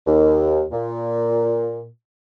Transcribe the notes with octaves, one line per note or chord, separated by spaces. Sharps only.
D#2
A#2